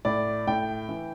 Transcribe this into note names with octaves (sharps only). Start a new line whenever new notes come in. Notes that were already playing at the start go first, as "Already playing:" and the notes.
A2 D5
A2 G5
E3